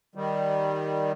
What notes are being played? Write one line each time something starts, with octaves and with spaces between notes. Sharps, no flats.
D#3 G3